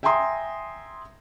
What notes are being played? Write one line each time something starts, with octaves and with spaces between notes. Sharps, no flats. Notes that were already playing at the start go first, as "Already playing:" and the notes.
E5 G5 G#5 A#5 C6 D#6